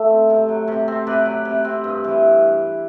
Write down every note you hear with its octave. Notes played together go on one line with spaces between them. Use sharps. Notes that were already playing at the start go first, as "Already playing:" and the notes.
Already playing: A3 E5
C4
C3
F#3
C3
C4
C3 B4 D5
F#3
C3
C4
G2
E3